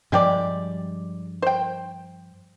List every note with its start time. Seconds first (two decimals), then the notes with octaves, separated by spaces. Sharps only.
0.12 G2 F3 G3 G#3 G4 D5
1.42 C5 G5